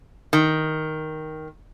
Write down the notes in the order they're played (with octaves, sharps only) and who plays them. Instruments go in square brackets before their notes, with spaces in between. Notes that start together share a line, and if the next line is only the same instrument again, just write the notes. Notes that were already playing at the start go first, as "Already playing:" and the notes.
[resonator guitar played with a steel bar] D#3